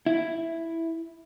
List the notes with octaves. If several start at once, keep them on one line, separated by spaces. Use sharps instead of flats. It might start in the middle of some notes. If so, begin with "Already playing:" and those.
E4